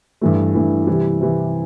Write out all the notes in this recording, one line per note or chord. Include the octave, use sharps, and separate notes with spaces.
G2 E3 A3
G2 E3 A3
C3 E3 G3
C3 E3 G3